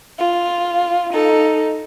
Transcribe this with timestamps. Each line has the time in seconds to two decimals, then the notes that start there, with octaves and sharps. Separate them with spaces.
0.19 F4
1.13 D#4 A4